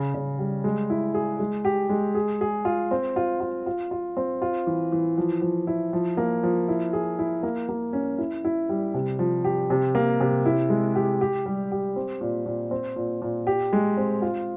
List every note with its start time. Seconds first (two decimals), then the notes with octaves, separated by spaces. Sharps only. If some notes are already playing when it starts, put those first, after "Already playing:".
Already playing: C#3
0.15 C#3
0.39 G3
0.64 G#3
0.90 E4
1.14 G#4
1.39 G#3
1.65 G4
1.90 G#3
2.15 G#4
2.41 G#4
2.65 F4
2.91 C4
3.16 F4
3.40 F4
3.66 F4
3.91 F4
4.17 C4
4.42 F4
4.67 E3
4.92 E3
5.18 F3
5.42 F3
5.67 E4
5.93 F3
6.17 A#3
6.43 F3
6.69 E4
6.93 G#4
7.19 E4
7.43 A#3
7.69 A#3
7.93 C#4
8.18 E4
8.45 E4
8.69 G3
8.94 C3
9.19 F3
9.44 G4
9.70 C3
9.95 A#3
10.21 C3
10.46 E4
10.70 G#3
10.95 G4
11.21 G4
11.46 G3
11.71 G4
11.96 C4
12.21 A#2
12.46 A#2
12.71 C4
12.96 A#2
13.22 A#2
13.47 G4
13.73 G#3
13.97 C4
14.22 F4